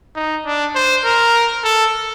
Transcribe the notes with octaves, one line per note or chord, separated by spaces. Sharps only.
D#4
D4
C5
A#4
A4